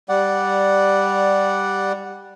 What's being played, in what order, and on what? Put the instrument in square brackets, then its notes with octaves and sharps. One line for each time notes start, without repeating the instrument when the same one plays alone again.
[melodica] G3 D5 F#5